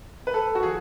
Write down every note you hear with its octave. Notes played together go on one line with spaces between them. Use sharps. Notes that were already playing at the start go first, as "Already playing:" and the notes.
B4
A4
F#4
F3 G#4